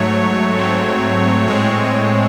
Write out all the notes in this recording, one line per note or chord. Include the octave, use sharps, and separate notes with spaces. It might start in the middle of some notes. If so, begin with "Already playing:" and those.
Already playing: G#2 F#3 A3 C#5
G#2 F#3 A3 C4
A2 G#3 C4 C#5